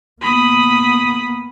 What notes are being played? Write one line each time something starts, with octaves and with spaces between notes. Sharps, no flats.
A#3 B3 B5 D#6